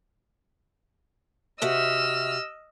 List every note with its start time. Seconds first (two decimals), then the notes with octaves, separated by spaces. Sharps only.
1.62 C3 F#4 D#5 E5 E6 F6